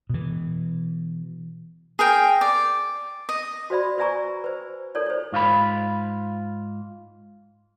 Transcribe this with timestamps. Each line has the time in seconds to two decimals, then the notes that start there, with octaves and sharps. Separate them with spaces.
0.09 B2 E3
1.99 G#4 A#4 G5
2.41 D5
3.29 D#5
3.70 F#4 C5 D5 E5 B5
3.98 B4 D5 E5 G#5 A#5 C#6
4.44 B4 C5
4.95 D#4 A4 A#4 C#5 D5
5.06 C5 C#5
5.32 G#2 F4 F#4 B5